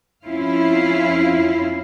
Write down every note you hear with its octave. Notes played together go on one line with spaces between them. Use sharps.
F2 C#4 E4 F4 F5